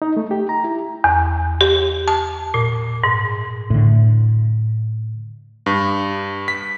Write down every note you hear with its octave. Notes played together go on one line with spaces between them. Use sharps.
D#4
A3
G4
A#5
E4
E2
G4
A5
A#2
G#2
A2 D3
G2
B6